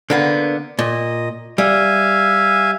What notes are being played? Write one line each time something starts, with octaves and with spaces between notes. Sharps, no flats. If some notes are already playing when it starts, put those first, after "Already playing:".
D3 A#3 B3
A#2 D#5
G3 E5 F5 G#5